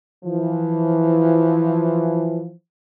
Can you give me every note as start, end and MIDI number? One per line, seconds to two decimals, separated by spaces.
0.24 2.50 52
0.24 2.50 53